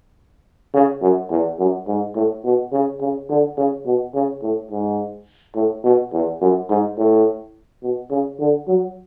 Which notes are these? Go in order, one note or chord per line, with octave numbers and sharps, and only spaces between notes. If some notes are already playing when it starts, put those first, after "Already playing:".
C#3
F#2
E2
F#2
G#2
A2
B2
C#3
C#3
D3
C#3
B2
C#3
A2
G#2
A2
B2
E2
F#2
G#2
A2
B2
C#3
D3
F#3